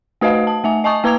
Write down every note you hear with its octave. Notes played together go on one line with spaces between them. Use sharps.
A3 F#4 B4 D#5 F5
A5
A3 E5 G#5
D#5 G#5 A5 C#6 D#6
A#3 B4 A#5 D6 G#6 F7